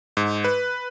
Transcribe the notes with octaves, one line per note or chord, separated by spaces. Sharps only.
G#2
B4